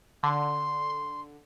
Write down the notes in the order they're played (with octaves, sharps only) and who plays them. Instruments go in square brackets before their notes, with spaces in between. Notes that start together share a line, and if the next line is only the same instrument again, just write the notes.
[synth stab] D3 [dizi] C6